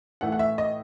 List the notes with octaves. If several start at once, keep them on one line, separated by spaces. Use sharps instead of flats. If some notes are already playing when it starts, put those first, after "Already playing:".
A2 E3 A3 F#5
F#5
E5
D#5